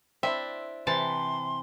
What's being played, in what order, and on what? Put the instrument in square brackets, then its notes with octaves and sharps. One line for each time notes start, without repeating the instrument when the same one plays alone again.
[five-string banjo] C4 D4 E4 [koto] E5
[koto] C3 E3 A5 [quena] C6